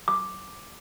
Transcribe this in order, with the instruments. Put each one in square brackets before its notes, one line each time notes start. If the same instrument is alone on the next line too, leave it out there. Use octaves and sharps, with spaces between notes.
[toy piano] D6